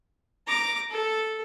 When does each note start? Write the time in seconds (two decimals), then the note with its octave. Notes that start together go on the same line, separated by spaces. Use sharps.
0.47 A#5 D6
0.90 A4